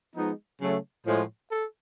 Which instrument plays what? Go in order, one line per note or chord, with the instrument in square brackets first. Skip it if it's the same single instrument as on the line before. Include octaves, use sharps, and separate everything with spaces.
[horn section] F3 G#3 B3 D#4
C#3 F#3 A3
A2 F3 G#3
A4